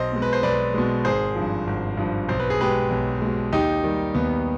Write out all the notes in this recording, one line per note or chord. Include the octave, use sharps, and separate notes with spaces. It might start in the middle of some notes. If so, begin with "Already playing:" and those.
Already playing: B1 C5 D#5
B2 G#3
B4
C5
B1 B4 D5
B2 G#3
G#1 G#4 C5
G2 F3
G#1
G2 F3
B1 C5
B4
G#4
B2 G#3 G4 B4
B1
B2 G#3
D#2 D#4 G4
D#3 G3
D#2 B3